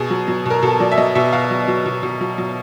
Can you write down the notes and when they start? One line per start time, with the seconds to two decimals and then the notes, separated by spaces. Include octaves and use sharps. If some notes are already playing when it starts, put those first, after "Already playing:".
Already playing: B2 G#4
0.10 F#3
0.28 F#3
0.46 B2 A#4
0.63 B2 A4
0.80 F#3 D5
0.92 E5
0.97 F#3 D#5
1.15 B2 E5
1.33 B2 F5
1.51 F#3
1.68 F#3
1.86 B2
2.03 B2
2.21 F#3
2.38 F#3